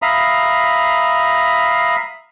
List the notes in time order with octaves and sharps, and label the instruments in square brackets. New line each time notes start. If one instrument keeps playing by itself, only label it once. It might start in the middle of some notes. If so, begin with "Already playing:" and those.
[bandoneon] E5 F5 A#5 B5 D#6